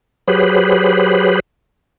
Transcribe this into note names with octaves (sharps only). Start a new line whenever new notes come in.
F#3 G4 G#4 B4 C5 B5